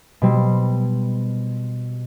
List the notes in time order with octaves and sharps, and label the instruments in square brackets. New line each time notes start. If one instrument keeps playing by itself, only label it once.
[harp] B2 G3 C4